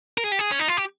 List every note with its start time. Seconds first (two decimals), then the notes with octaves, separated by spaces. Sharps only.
0.18 A#4
0.24 G#4
0.32 G4
0.39 G#4
0.51 C#4
0.59 D#4
0.68 F4
0.77 G4